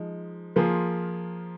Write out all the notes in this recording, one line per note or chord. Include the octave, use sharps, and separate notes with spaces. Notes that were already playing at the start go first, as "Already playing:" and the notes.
Already playing: F3 G#3 D#4
F3 A#3 F4 G#4